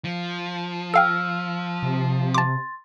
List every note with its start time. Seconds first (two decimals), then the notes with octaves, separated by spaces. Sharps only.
0.05 F3
0.94 A4 F5 G5 E6 F6
1.82 C3
2.34 A5 C6 D6 A6